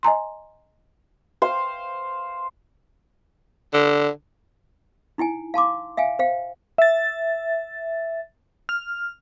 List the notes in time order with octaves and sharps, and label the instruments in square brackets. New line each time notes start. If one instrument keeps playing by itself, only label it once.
[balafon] D#5 G#5 A#5 C6
[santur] C5 F5
[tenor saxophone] D3
[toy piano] D#4 E4 G5 G#5
F5 A5 C6 D6
E5 F5 G5 G#5
C5 F5 G5
[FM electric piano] E5 A6
F6